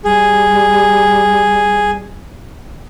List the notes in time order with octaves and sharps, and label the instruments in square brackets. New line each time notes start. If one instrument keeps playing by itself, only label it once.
[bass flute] G3 [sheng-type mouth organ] G#4